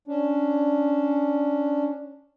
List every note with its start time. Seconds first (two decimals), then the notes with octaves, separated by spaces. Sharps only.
0.08 C#4 D4